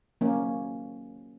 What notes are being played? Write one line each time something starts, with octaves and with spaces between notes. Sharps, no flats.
F#3 A#3 C#4